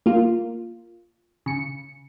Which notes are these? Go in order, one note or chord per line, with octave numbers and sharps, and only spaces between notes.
A#3 F4
C#3 C#7